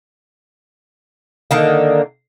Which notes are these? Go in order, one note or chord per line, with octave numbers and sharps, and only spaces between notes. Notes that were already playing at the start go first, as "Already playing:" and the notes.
D3 D#3 A#3